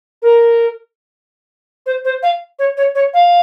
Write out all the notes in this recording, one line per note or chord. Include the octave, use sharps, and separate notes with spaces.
A#4
C5
C5
F5
C#5
C#5
C#5
F5